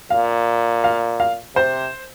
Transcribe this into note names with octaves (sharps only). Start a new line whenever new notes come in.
A#2 F5
F5
F5
C3 C5